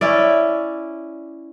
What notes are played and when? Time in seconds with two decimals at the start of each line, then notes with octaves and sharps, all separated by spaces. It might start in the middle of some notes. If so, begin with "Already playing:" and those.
0.01 C#4 E4 D5